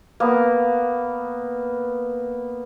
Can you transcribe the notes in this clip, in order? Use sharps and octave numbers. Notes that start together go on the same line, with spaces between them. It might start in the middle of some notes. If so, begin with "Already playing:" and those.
A#3 B3